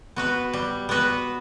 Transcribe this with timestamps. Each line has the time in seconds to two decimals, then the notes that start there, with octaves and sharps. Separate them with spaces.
0.16 B3 F#4 B4
0.53 G3
0.89 B3 F#4 B4